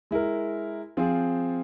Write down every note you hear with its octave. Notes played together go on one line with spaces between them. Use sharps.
G#3 E4 A#4
F3 C4 F4 G#4